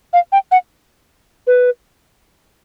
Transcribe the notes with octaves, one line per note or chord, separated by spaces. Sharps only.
F5
G5
F#5
B4